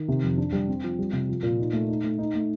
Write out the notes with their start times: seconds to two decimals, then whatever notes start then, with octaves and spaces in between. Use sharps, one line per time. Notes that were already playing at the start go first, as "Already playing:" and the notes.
Already playing: D#3
0.08 C3
0.23 F2
0.37 D4
0.52 G3
0.68 C4
0.84 F3
0.99 G3
1.13 C3
1.29 F3
1.43 A#2
1.59 D#4
1.73 A3
1.88 D#4
2.04 A3
2.18 D#4
2.35 A3